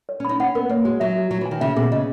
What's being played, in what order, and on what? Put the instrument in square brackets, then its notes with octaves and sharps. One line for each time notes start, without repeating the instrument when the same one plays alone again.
[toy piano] C#5
[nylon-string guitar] C#4
[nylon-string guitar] D#4 [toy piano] B5
[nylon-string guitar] C#4 [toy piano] F#5
[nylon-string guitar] B3 [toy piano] A#4
[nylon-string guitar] A#3 [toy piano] C#5
[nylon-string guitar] G#3 [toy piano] F#4
[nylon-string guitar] F#3 [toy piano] E5
[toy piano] F#4
[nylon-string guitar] F#3 [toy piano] C#5
[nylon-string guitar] E3
[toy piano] G#5
[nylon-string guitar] D#3
[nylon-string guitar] C#3 [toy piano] E5
[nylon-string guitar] B2 [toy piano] G#4
[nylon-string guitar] C#3 [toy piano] D#5